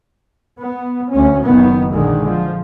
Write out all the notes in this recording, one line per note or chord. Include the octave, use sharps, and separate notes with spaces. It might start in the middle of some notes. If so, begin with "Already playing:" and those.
B3
D2 C#4
F#1 D#3 B3
A#1 D3 D#3 G#3
F3